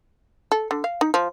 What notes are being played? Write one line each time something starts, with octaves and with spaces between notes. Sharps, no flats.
A4
D3
F5
D#4
F3